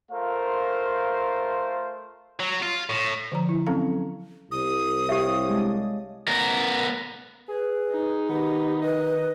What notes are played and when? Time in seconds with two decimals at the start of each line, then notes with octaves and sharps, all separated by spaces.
0.12 A3 F4 A#4 C5 F5
2.40 F#3
2.62 F4
2.90 A2
3.32 D3 F3 A#5
3.49 E4
3.66 F#3 C4 C#4 A4 F5 A#5
4.51 C2 D#6
5.09 G4 C#5 E5 F5 G5
5.49 G#3 D4
6.28 B3 A#4
7.48 G#4 B4
7.91 D#4
8.29 D#3 B3 G4
8.82 B4 D#5